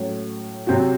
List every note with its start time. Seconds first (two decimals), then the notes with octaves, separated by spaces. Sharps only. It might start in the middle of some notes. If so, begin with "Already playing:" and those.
Already playing: A2 F#3 C#4
0.67 C3 F#3 C4 F#4